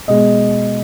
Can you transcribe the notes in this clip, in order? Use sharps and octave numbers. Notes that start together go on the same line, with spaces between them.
B2 G#3 D#5